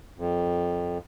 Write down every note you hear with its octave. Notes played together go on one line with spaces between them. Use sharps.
F2